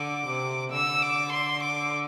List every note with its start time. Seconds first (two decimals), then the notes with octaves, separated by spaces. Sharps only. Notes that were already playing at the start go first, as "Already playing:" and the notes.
Already playing: D3 D6
0.26 C3
0.72 D3 E6
1.02 D6
1.33 C6
1.64 D6